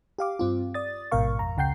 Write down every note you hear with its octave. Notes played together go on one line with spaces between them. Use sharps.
G4 F5 D6
G2 C4 F4
D5 D#6 A6
A1 G#2 B2 A#4 F5 C#6
F2 A#5
C#2 C#3 F#5 G5 G6 C7